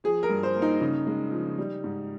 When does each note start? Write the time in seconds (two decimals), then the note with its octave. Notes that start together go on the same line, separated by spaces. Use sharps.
0.04 F3 G#4
0.23 A#4
0.29 G2
0.43 C5
0.56 A#3
0.62 D#4
0.80 C#3 D#4
1.07 G#3
1.32 F3
1.58 G3
1.84 G#2